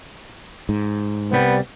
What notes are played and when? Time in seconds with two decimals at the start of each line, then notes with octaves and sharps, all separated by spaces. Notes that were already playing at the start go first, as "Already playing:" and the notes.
0.69 G#2
1.32 C2 G3 B3